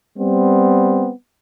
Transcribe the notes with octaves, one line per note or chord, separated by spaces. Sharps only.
G3 B3 C4